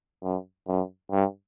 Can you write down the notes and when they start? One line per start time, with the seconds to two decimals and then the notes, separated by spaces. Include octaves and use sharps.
0.23 F#2
0.68 F#2
1.11 G2